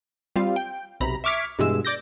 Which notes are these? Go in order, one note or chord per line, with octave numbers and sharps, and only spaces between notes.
G3 C4 F4 F5
G5
B1 C3 A#5 B5
E5 C#6 D6 F6 G#6 B6
G2 B2 E3 G#3 E6
D5 D6 G6 A#6